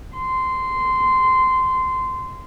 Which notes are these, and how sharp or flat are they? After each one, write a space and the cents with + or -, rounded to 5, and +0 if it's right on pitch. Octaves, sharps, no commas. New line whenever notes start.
C6 -15